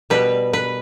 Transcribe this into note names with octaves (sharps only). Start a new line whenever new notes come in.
B2 G3 B4
B4